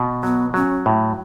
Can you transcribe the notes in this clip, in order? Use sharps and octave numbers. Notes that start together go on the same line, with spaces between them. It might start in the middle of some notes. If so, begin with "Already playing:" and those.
Already playing: B2
F#3 B3
F#3 C#4
A2